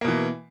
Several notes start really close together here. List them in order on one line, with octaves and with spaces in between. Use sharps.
A#3 B2 E3